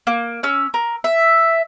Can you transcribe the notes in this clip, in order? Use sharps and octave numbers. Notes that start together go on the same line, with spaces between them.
A#3
C#4 E6
A#4
E5